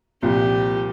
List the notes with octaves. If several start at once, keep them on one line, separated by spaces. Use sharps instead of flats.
C2 A#2 F3 G4